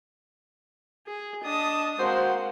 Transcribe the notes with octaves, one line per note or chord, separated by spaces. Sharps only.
G#4
D4 D#5 A5 D#6
G#3 A#3 C4 F#4 C5 F#5